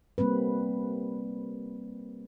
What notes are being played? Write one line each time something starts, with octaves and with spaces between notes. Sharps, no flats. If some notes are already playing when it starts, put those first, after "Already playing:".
G3 A#3 C4 B4